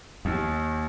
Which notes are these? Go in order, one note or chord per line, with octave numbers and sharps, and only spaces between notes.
D#2